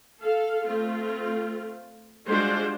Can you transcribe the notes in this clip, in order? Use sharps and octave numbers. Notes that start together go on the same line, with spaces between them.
A4 F5
A3 C4 F4
G3 G#3 D4 F4 F#4 C5